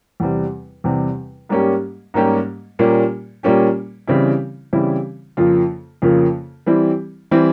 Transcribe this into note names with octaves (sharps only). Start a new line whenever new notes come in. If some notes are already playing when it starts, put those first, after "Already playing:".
E2 C3 G3 C4
E2 C3 G3 C4
G#2 G3 A#3 C#4 G4
G#2 G3 A#3 C#4 G4
A#2 G3 A#3 C#4 G4
A#2 G3 A#3 C#4 G4
C#3 E3 G3 C4 E4
C#3 E3 G3 C4 E4
F2 C#3 F3 A#3 F4
F2 C#3 F3 A#3 F4
E3 G3 C4 E4
E3 G3 C4 E4